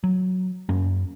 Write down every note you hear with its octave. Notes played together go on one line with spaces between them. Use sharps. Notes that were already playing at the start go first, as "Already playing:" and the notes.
F#3
F#2 A#3 C#4